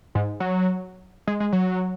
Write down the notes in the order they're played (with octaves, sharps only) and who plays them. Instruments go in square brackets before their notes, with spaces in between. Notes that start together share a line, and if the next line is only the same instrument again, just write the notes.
[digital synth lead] G#2
F#3
G#3
G#3
F#3